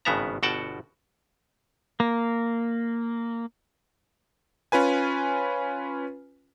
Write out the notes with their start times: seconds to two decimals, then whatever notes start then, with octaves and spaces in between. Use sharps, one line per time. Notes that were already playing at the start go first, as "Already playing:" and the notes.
0.05 G#1 G2 C#3 B3 E5 A#5
0.43 G1 B2 F#4 F#5 G5 A5
2.00 A#3
4.72 C#4 F4 B4 G#5